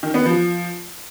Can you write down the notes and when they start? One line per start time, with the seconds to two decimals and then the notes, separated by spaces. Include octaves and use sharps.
0.03 D#3
0.14 B3
0.26 F3